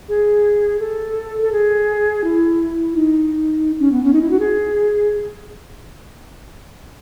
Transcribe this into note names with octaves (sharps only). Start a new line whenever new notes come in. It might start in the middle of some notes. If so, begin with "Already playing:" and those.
G#4
A4
A4
G#4
E4
D#4
C#4
B3
C#4
D#4
E4
F#4
G#4